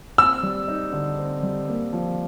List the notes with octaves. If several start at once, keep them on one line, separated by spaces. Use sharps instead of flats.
C4 E6
G3
D#4
D3
C4
G3
A#3
F3